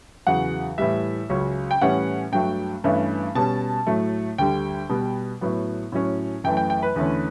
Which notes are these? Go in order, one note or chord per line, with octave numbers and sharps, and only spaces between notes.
E2 C#3 F#3 F#5
A2 E3 G3 E5
C#2 C#3 F#3 C#4
G5
A2 E3 G3 C#4 F#5
G2 F#3 A3 G5
G2 E3 A3 C#4
B2 G3 C#4 A5
A2 F#3 A3
D2 D3 G3 G5
B2 G3 B3
A2 F#3 B3
A2 F#3 C#4
F#2 E3 A3 G5
G5
G5
B4
E2 D3 A3 C#4